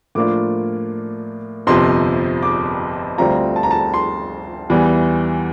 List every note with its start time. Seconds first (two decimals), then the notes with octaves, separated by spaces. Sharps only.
0.15 A2 F3 A#3 D4 F4 D6
1.67 G1 F2 C3 F3 C6
2.43 D6
3.18 D2 D3 G3 C4 F4 A#5
3.56 A5
3.63 A#5
3.71 A5
3.94 C6
4.70 E2 E3 G3